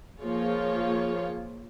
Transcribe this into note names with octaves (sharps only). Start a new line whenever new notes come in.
F3 A#3 F4 G#4 C#5